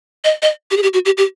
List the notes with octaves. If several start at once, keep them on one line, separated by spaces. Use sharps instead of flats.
D#5
D#5
G4
G#4
G4
F#4
G4
G4